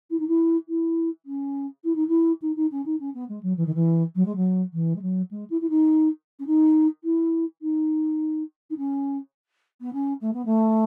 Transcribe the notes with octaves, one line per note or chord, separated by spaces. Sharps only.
E4
D#4
E4
E4
C#4
E4
D#4
E4
D#4
D#4
C#4
D#4
C#4
B3
G#3
F#3
E3
D#3
E3
F#3
G#3
F#3
E3
G#3
F#3
G#3
E4
E4
D#4
C#4
D#4
E4
D#4
D#4
C#4
B3
C#4
A3
B3
A3